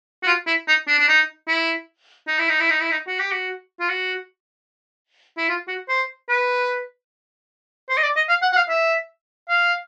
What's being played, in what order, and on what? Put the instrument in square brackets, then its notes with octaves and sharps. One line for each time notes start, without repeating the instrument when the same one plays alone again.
[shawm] F#4
F4
E4
D#4
D4
D4
D#4
E4
D#4
E4
D#4
E4
D#4
E4
D#4
F#4
G4
F#4
F4
F#4
E4
F4
F#4
C5
B4
C5
D#5
D5
D#5
F5
F#5
F#5
F5
E5
F5